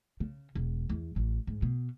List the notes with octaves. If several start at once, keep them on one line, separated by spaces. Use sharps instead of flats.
C#3
E1
E2
A1
G#2
B2